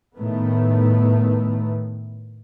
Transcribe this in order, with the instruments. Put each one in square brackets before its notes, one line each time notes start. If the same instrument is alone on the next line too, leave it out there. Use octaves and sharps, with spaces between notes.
[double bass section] A2 D#3 A3 B3